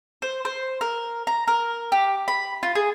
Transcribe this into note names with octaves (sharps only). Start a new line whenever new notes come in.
C5
C5
A#4
A#5
A#4
G4
B5
F4
G#4